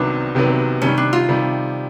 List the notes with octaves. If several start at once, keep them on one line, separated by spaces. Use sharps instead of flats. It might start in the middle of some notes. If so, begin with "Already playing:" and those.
Already playing: C2 C3 D#3 F#3 B3 D4
C2 C3 D#3 F#3 B3
C3 D#3 G3 C#4
D4
F4
C3 D#3 G3